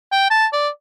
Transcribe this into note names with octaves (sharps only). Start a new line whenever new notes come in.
G5
A5
D5